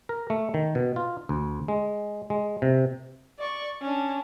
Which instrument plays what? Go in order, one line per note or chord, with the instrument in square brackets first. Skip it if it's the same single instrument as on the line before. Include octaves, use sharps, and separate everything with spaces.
[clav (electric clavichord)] A#4
A3
D#3
B2
F4
D2
G#3
G#3
C3
[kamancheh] D5 C#6
C#4 D4